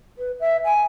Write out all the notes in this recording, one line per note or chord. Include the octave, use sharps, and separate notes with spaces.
B4
E5
G#5